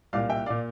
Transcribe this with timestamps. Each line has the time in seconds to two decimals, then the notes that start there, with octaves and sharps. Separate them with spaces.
0.13 C2 A#2 D5 F5
0.30 E5 G5
0.46 A#2 D5 F5